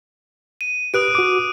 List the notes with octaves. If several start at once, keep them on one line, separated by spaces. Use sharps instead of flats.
D#7
G4 B4 D#6 F#6 D7
F#4 D6